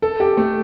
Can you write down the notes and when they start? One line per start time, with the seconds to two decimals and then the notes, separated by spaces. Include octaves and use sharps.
0.02 A4
0.20 G4
0.37 A3